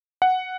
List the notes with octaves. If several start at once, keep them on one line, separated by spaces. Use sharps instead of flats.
F#5